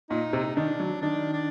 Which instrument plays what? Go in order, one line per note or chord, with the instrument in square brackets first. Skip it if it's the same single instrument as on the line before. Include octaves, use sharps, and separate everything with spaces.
[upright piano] A#2 [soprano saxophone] D#4
[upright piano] C3
[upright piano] D#3 [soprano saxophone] D4
[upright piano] F#3
[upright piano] D#3 [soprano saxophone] D4
[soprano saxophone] D4